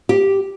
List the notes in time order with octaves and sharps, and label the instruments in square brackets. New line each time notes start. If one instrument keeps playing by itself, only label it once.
[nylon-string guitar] G4